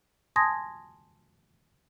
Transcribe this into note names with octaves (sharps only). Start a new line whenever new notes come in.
G#5 A5 C6 D#6 G#6 A#6